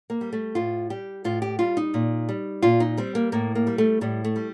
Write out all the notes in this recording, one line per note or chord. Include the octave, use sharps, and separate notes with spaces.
A#3
G3
A3
A2 F4
G3 G4
A2 F4
G4
G3 F4
D#4
A#2
G3
A#2 F4
D#4
G3 C4
A#3
A2 A#3
A#3
G3
A3
A2 G3
A3
G3